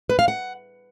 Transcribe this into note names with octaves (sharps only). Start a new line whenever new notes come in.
B4
F5
F#5